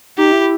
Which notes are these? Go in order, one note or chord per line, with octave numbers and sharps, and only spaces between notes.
D#4 G4
E4